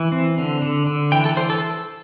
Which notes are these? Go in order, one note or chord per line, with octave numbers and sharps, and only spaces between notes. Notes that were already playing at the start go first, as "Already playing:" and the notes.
Already playing: E3
C4
D3
D3
D3
E3 G5
A4
E3 C5
A4